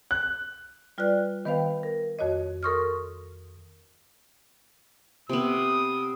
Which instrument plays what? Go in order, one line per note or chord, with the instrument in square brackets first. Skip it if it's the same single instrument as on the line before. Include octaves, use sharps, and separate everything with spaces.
[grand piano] F#6
[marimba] G3 F4 B4 D5 F#6
D#3 B3 B4 C5 F5 G5
A#4
F2 F#4 C#5 D#5
A4 A#4 C6 C#6 D#6 F6
[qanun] C3 B3 [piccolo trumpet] D#6